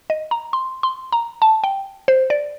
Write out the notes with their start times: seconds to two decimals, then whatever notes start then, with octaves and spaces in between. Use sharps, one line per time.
0.10 D#5
0.31 A#5
0.53 C6
0.83 C6
1.12 A#5
1.42 A5
1.64 G5
2.08 C5
2.30 D5